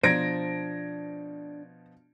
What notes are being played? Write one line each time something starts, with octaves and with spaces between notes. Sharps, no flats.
B2 F3 D4 C5 A#5 G#6 A#6 D7